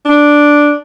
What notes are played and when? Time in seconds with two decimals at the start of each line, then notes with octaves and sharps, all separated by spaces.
0.05 D4